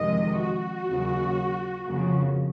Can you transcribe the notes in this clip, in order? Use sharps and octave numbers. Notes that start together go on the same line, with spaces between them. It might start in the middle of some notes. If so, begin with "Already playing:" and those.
Already playing: F2 C3 D#3 G#3 D#5
F#4
D#2 C#3 F#3
F2 C#3 F3 A#3